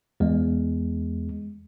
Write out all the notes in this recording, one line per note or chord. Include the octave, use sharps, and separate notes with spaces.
E2 G#3